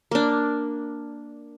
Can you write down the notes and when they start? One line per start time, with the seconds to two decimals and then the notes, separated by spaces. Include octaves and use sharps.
0.11 A#3 D4